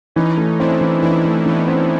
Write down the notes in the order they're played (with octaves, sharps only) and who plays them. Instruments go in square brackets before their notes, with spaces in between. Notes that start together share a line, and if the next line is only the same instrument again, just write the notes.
[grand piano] E3 [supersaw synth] C#4 D#4
[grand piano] A3
[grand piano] C4 [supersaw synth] D4 E4
[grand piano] E3
[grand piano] E3 [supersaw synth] D4 E4
[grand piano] A3
[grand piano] E3 [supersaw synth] B3 C#4
[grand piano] C4